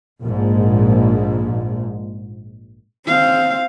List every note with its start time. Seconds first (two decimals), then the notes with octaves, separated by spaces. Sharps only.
0.22 A#1 G#2
3.06 C4 F5